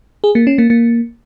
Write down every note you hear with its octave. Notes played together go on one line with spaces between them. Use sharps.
G#4
A#3
C#4
A#3
A#3